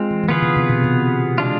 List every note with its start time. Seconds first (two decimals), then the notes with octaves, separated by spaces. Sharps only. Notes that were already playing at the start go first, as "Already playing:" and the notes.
Already playing: G#3 C4 F4
0.11 E3
0.24 E3
0.29 D3 B3 F4 G#4 B4
0.42 C3
0.57 C3
0.69 B2
0.84 C3
1.38 G#3 D4 F4